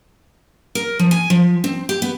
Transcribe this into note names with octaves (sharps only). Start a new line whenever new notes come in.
A#4
F3
G#5
F3
C4
G4
B3